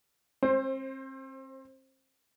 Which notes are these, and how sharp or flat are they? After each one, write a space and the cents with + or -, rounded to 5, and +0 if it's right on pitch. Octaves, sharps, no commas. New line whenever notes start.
C4 +35 C5 +15